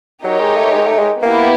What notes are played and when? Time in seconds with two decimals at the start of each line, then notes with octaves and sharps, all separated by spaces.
0.24 F#3 D#4 G4 A#4 C#5
0.40 G#3
0.57 A3
0.73 G#3
0.86 A3
0.99 G#3
1.22 A#3 B3 E4 G4 B4